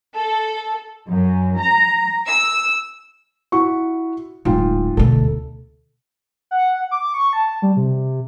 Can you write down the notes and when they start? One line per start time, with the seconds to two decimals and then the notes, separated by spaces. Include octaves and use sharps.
0.16 A4
1.08 F#2
1.58 A#5
2.28 E6
3.52 E4 F#4 C#6
4.45 D1 G#2 F4 G5
4.97 D2 B2 A4
6.51 F#5
6.91 D6
7.14 C#6
7.33 A5
7.62 G3
7.77 C3